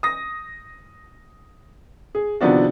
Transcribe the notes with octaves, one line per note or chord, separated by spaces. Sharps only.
D#6 A#6
G#4
C3 D#3 F3 B3 D4 F#4